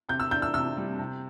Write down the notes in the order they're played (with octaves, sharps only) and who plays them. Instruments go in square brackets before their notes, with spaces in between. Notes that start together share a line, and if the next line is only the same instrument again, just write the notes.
[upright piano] C3 G6
E6
D4 G6
E6
C3 E6
G3
C3